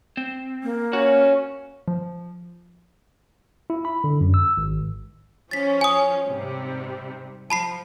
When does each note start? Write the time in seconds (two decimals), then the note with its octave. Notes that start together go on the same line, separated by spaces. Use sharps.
0.17 C4
0.63 A#3
0.93 C#4 F#4 F#5
1.88 F3
3.70 E4
3.85 B5
4.04 D3
4.21 F#2
4.34 E6
4.57 G#1
5.51 F3 C#4 A6 B6
5.81 G#5 D#6
6.27 G#2 C3 G3
7.50 F3 A5 B5 C7